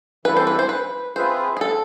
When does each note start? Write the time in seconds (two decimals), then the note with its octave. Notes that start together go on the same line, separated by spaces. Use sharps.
0.25 E3 G3 C4 E4 A4 B4
0.37 C5
0.47 B4
0.59 C5
0.69 B4
1.15 C4 F4 G#4 B4 C5 E5
1.57 G#4
1.61 A4